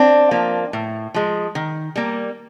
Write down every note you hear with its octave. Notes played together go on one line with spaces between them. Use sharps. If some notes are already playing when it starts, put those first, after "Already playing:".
Already playing: C4 D4
F3 A#3
A2
F3 G#3
D#3
G3 A#3